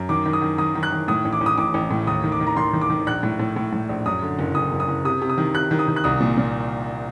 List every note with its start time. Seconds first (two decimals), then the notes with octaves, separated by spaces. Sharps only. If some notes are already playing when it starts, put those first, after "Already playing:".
Already playing: F#2
0.09 D#3 D6
0.26 D#3
0.33 D#6
0.42 D#3
0.58 D#3 D#6
0.75 D#3
0.83 F#6
0.92 D#3
1.08 A2 D#6
1.25 A1
1.33 D6
1.41 A1
1.46 D#6
1.58 A1 D6
1.74 A1
1.90 A2
2.07 D#2 D#6
2.24 D#3
2.32 D6
2.40 D#3
2.47 A#5
2.57 D#3 C6
2.73 D#3
2.81 D6
2.90 D#3
3.07 A#1 F#6
3.23 A2
3.39 A2
3.56 A2
3.73 A2
3.89 A#1
4.06 F#2 D#6
4.23 D3
4.39 F#1
4.55 F#1 D#6
4.72 F#1
4.80 D#6
4.88 F#1
5.05 C3 D#6
5.22 C3
5.29 D#6
5.38 D#3
5.54 C3 F#6
5.71 D#3
5.79 D#6
5.88 D#3
5.96 F#6
6.04 C2 D#6
6.21 A#2
6.38 A#2